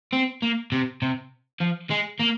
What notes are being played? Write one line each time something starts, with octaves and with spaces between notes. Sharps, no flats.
C4
A#3
C3
C3
F3
G#3
A#3